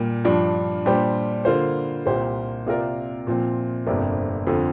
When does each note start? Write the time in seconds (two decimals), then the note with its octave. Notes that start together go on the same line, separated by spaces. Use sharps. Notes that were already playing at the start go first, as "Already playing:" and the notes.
Already playing: A#2 G3 A#3
0.24 G2 F3 D4
0.85 A#2 G3 D4 G4 C5
1.45 D3 A#3 F4 C5
2.06 C2 A#2 A#3 G4 C5
2.67 C3 A#3 F4 A#4 D5
3.27 A#2 F3 C4
3.86 G1 F2 C3 A#3 D4
4.47 F2 D3 F3